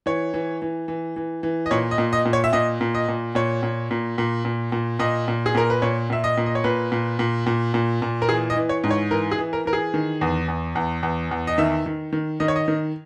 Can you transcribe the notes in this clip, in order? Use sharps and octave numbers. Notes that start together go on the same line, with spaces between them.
E3 C#5
E3
E3
E3
E3
E3
D#5
A#2 C#5
D#5
A#2
D#5
A#2
C#5
E5
A#2 D#5
A#2
D#5
A#2
A#2 C#5
A#2
A#2
A#2
A#2
A#2
A#2 D#5
A#2
G#4
A#2 A#4
B4
A#2 C#5
A#2 E5
D#5
A#2
D#5
C#5
A#2 B4
A#2
A#2
A#2
A#2
A#2
A#4
E3 G#4
D#5
E3
C#5
G#2
C#5
E3 A#4
G#4
E3
A#4
E3 A#4
G#4
D#3
E2
E2
E2
E2
E2
D#5
D#3 E5
D#3
D#3
D#3 D#5
C#5
D#5
D#3